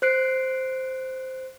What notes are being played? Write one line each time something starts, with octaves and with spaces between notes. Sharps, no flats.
C5 F#6 C7 D7